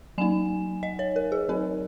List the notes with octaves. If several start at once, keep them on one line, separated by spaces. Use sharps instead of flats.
F#3 A#3 D#4 G#5
D#5
C#5
A#4
G#4
F#3 C4 D#4 A#4